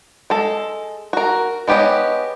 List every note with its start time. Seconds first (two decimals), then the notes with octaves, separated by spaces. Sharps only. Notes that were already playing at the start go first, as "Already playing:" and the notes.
0.30 G#3 A4
1.13 F#4 A#4
1.68 G#3 B3 G4 C#5 D#5